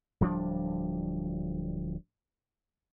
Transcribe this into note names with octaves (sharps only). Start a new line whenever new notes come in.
D1 F3 G3 D4